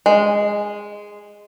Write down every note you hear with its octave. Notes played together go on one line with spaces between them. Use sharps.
G#3